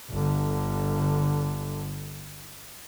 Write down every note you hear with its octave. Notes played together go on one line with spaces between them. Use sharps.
G1 D3